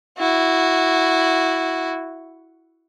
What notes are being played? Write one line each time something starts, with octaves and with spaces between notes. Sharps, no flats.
E4 F#4